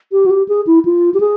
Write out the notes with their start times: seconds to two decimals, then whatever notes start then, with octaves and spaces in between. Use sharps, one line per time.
0.12 G4
0.26 F#4
0.30 G4
0.48 G#4
0.67 E4
0.85 F4
1.14 G4
1.20 G#4